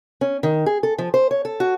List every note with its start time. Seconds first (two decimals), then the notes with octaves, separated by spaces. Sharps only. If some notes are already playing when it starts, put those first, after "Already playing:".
0.21 C#4
0.43 D#3
0.66 G#4
0.83 A4
0.98 F3
1.14 C5
1.31 C#5
1.45 A4
1.60 F#4